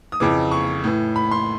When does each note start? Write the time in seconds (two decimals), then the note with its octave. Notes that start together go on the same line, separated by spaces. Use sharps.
0.12 D#6
0.20 F2 C#3 E3 D6
0.51 C#6
0.84 A2 E3
1.16 B5
1.31 C6